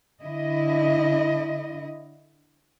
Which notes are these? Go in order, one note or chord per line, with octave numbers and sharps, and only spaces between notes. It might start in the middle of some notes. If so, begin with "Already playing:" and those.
D3 E4 D#5